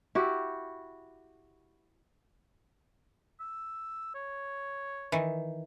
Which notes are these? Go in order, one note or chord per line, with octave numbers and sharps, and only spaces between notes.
E4 F#4 G4
E6
C#5
D#3 E3